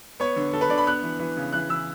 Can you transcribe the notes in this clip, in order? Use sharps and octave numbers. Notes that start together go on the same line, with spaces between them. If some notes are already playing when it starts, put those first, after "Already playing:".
B3 C#5
D3
D3 A4
B4
D3 D5
B5
B3 F#6
E3
E3
C#3
E3 F#6
E3 E6